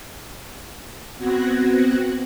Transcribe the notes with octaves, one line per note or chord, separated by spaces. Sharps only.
B3 C4 F#4 F#6 G#6 A#6